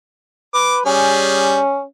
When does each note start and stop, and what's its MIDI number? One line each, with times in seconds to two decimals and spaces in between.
0.54 0.81 71
0.54 0.77 86
0.85 1.59 55
0.85 1.83 61
0.85 1.59 68